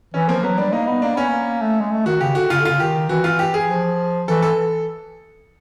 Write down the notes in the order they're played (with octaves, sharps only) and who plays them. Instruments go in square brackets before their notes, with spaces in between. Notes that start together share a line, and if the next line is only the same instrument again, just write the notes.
[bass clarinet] E3 [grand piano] C#4
[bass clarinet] F3 [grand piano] A#3
[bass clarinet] F#3 [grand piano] B3
[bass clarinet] G3 [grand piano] D4
[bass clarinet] A#3 [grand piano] D#4
[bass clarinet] B3 [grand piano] D#4
[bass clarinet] A#3 [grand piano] D4
[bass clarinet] B3 [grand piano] C#4
[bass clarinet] A#3
A3
G#3
A3
[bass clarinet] D#3 [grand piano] F#4
[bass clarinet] C#3 [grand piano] G4
[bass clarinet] D3 [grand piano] F#4
[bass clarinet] C#3 [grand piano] F4
[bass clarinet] D3
[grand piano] F4
[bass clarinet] C#3
[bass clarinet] D#3 [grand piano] G4
[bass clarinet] E3 [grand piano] F#4
[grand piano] F4
G4
G#4
[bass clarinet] F3
[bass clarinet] E3 [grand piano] A4
[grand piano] A4